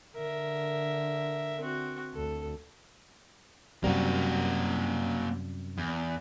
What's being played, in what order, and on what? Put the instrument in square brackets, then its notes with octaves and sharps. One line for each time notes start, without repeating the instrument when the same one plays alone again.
[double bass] D3 [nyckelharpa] A#4 E5
[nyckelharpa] C4 F#4
[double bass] D2 [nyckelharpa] A4
[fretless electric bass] F#2 C3 G3 [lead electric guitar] A#3 F#4
[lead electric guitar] E2